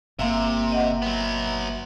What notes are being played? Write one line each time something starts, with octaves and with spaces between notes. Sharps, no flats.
G1 C3 A#3 E5 F5 A#5 C6
D#5 F#5
F#3 B3